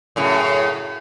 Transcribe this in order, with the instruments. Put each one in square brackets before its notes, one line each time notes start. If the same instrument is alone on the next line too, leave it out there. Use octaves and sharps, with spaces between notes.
[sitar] F#2 A2 C#3